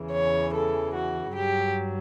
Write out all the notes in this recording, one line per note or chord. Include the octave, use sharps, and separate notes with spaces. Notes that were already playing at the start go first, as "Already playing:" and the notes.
Already playing: E2 C#3 E3
C#5
A4
F#4
G2 F#3 G4